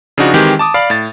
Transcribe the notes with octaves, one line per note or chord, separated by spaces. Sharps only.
C#3 F3 D4 D#4 F#4
D#3 E3 G#3 C4 G4
A5 D6 D#6
D5 F5 B5
A2 A6